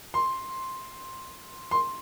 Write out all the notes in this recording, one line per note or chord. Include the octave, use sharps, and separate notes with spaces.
C6
C6